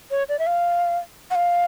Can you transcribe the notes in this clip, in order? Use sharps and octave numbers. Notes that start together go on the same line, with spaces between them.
C#5
D5
E5
F5
F#5
F5